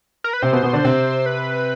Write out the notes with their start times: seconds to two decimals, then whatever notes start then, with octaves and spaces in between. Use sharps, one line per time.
0.24 A#4
0.33 B4
0.42 C3 C4 C5
0.52 B2 B3
0.63 B2 B3
0.73 D3 D4
0.84 C3 C4
1.26 B4